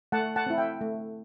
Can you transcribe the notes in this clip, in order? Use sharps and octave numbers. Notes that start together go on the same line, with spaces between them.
A3 F#5 A5
F#5 A5
C4 E4
E5 G5
A3